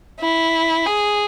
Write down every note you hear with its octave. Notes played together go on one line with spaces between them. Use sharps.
E4
G#4